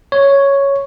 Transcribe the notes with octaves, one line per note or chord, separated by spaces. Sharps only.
C#5